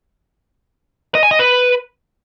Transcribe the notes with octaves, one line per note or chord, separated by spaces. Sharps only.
D#5
G#5
D#5
B4